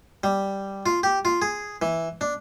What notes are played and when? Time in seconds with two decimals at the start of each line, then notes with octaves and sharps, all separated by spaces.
0.24 G3
0.86 F4
1.03 G4
1.25 F4
1.42 G#4
1.82 E3
2.21 D4